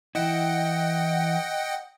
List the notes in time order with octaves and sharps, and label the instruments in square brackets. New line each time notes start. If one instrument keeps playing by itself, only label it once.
[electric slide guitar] E3 E4 [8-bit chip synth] D#5 F#5 G5